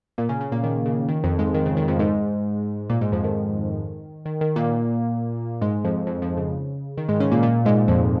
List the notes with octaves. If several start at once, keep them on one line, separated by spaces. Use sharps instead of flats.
A#2 A#3
C#3 C#4
C#3 C#4
A#2 A#3
D#3
C#3
D#3
F2 F3
G#2 G#3
D#3
C#3
D#3
F2 F3
G#2 G#3
A#2 A#3
G#2 G#3
F2 F3
D#3
D#3
D#3
A#2 A#3
G#2 G#3
F2 F3
F2 F3
F2 F3
C#3
D#3
G#2 G#3
C#3 C#4
A#2 A#3
A#2 A#3
G#2 G#3
F2 F3